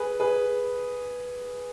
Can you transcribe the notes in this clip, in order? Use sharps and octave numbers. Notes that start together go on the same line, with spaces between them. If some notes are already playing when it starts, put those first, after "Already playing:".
Already playing: G#4 B4
G#4 B4